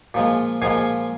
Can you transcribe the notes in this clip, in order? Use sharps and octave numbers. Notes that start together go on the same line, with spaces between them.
A#2 F3 G#3
A#2 F3 G#3 F5 G#5